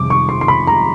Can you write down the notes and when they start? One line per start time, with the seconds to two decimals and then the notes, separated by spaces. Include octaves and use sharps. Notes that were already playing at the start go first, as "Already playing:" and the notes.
Already playing: F2 C3 D#3 G3 D6
0.10 C#6
0.29 C6
0.41 C6
0.48 B5
0.67 A#5